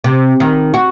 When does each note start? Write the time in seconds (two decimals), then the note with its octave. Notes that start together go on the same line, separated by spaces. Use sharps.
0.04 C3
0.40 D#3
0.74 F#4